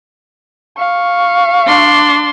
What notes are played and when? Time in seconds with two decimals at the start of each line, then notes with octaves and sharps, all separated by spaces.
0.77 F5 C#6
1.67 D4 C6